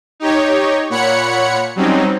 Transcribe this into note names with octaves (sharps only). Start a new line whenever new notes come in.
D#4 G4 C#5
A#2 C#5 F#5 B5 C#7
F#3 G3 C4 C#4 D#4